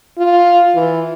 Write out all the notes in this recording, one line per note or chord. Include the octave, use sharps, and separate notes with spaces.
F4
E3